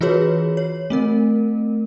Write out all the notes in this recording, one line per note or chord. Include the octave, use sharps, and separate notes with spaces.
E3 F4 F#4 G#4 B4 C#5
C#5
A3 C4 A#4